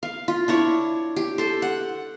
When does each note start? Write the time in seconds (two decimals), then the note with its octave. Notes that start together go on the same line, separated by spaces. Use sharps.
0.03 F5
0.28 F4
0.48 D4 E4 C#5
1.16 G4
1.38 A4 C5
1.62 F#5